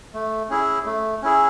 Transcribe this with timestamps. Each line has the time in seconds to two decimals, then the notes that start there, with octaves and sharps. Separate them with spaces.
0.14 A3
0.49 C#4 E4 G#4
0.86 A3
1.22 C#4 E4 G#4